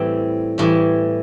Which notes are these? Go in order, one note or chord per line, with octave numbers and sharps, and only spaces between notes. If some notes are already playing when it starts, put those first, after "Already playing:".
Already playing: A2 E3 G3 C4
A2 E3 G3